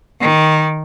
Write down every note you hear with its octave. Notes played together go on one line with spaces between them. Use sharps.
D#3